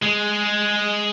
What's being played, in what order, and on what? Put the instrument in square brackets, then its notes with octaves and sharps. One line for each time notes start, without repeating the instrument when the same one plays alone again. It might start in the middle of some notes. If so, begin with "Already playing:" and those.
[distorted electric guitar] G#3